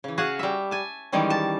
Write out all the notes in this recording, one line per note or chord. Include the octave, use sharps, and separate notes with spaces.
C#3 E3
F#4 G#4 C#5 F5 F#5
G3 E5
G#5 A5
D#3 E3 G3 G#3 C#4
A5